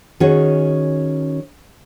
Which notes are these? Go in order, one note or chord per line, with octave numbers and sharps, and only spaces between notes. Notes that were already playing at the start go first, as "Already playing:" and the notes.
D#3 C#4 F#4 G#4 C#5